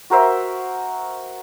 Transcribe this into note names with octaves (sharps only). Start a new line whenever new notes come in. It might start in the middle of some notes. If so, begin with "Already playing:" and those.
F#4 A#4 C5 E5